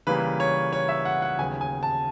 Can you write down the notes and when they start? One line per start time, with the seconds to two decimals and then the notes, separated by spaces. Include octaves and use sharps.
0.07 C#3 E3 G3 A#3 B4
0.40 C#5
0.73 C#5
0.89 E5
1.05 F#5
1.22 F#5
1.39 D#2 C#3 F#3 B3 G#5
1.61 G#5
1.83 A5